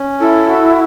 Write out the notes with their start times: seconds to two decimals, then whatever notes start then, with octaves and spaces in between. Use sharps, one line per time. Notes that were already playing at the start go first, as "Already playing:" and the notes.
Already playing: C#4
0.20 E4 A4
0.48 F#4